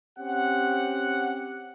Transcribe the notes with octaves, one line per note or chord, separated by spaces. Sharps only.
C4 C#4 G4 F#5